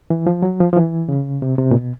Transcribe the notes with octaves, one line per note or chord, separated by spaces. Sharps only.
E3
F3
F#3
F3
F3
E3
C#3
C3
C3
A#2
B2